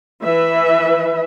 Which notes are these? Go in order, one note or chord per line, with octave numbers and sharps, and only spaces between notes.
E3 B4 E5